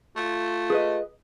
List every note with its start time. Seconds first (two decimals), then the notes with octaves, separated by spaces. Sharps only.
0.16 A3 F4
0.70 G#4 B4 D#5